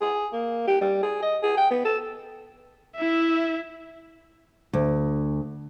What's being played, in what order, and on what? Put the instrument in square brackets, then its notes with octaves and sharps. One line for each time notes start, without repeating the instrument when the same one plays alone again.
[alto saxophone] G#4
A#3
G4
G3
G#4
D#5
G#4
G5
B3
A4
[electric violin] E4 E5
[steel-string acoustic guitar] D2